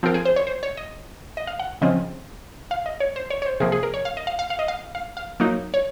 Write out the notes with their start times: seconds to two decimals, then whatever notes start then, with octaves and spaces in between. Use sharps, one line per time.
0.03 F3 C4 F4 A#4
0.14 G#4
0.25 C5
0.36 C#5
0.47 C5
0.63 C#5
0.77 D#5
1.37 D#5
1.47 F5
1.59 F#5
1.81 C#3 F3 C4 D#5
2.71 F5
2.86 D#5
3.00 C#5
3.16 C5
3.30 C#5
3.42 C#5
3.46 C5
3.60 C3 F3 A#3 G#4
3.72 G#4
3.83 A#4
3.94 C#5
4.05 F5
4.17 D#5
4.27 F5
4.39 F5
4.50 F5
4.59 D#5
4.68 F5
4.95 F5
5.17 F5
5.40 F#3 A#3 D#4
5.74 C#5